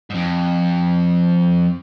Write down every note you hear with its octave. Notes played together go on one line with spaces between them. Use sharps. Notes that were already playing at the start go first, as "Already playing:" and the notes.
F2 G#2